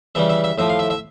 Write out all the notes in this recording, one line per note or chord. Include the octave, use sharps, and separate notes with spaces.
C#3 E3 G3 E5
E5
E5
A2 F3 E5
F5
E5
E5